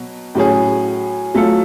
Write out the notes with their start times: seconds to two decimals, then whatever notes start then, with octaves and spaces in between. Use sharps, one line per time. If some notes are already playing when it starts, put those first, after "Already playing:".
Already playing: B2 F#3
0.35 A2 F#3 C#4 G#4
1.34 F#3 A3 F4 A4